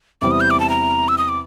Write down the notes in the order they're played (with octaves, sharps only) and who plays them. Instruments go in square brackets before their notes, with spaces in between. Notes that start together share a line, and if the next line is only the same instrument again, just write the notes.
[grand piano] E2 C3 E3 G3 C4 [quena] D6
[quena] D#6
G6
D6
A5
A#5
E6
D#6
D6